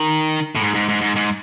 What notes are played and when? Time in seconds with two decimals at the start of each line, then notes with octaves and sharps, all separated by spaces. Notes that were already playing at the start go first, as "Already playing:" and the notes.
Already playing: D#3
0.55 A2
0.61 G#2
0.75 G#2
0.89 G#2
1.02 G#2
1.16 G#2